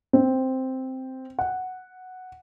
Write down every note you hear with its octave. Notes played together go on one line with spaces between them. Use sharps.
C4
F#5